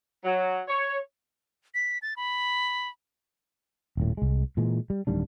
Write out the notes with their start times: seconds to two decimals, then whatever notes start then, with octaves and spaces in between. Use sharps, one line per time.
0.24 F#3
0.68 C#5
1.74 B6
2.02 A6
2.17 B5
3.97 D#1 A2
4.17 C2 G#3
4.57 A#2 E3 G#3
4.90 G3
5.07 D1 D#3 G3 D4